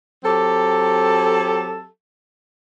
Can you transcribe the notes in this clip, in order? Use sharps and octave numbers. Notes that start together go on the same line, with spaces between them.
F#3 C4 G4 A4